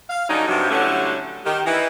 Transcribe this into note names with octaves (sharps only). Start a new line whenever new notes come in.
F5
D3 F#3 G3 C#4 D#4
G2 C3 F#3
A2 D3 F#3 G3 A3 C#4
D#3 G4
E3 D#4 E4